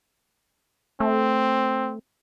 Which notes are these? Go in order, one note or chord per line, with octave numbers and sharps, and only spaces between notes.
A3 C4